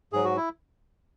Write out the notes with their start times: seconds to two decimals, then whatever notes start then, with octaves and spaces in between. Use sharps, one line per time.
0.13 G#2 F#3 G#4
0.24 F#4
0.37 E4